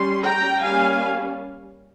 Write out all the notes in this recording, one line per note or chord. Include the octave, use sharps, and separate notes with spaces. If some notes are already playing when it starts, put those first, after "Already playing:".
Already playing: G3 C#4 C6
G5 A#5
G3 A#3 C#4 F5 G#5